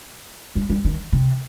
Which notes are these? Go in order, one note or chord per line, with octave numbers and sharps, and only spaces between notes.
G3
G3
D#3
C3